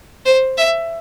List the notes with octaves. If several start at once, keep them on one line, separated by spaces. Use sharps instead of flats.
C5
E5